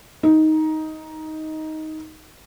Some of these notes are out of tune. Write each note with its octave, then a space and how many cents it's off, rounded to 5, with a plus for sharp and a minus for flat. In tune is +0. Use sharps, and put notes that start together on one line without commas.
D#4 +10